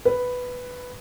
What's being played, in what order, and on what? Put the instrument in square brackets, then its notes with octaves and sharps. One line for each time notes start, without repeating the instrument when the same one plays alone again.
[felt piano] B4